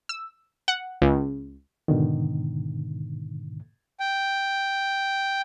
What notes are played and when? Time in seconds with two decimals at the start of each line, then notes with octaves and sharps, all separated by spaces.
0.09 E6
0.68 F#5
1.02 C#2
1.88 G#2 B2 D3 D#3
4.00 G5